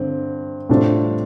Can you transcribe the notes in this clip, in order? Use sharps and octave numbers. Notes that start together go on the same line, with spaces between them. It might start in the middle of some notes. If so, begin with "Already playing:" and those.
Already playing: G2 D3 C4
A2 G3 D4 F4 C5